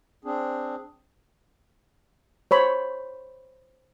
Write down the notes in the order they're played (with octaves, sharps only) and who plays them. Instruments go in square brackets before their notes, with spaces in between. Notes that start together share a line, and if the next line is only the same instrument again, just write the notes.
[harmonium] C4 D4 G#4
[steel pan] C5 C#5 B5